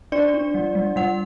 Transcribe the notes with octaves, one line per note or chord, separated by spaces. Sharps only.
D4 D5
D4
G3
G3
G3 F#5